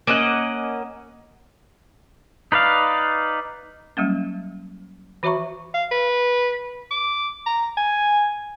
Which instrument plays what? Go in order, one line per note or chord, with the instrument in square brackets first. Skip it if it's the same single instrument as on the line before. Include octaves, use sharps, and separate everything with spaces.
[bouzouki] A#3 C#4 D#5 F#5
[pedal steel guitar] D#4 B4 D5 F5
[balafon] F#3 G3 A#3 C#4
E3 F#4 C#5 E5 A#5 C#6
[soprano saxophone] F5
B4
D6
A#5
G#5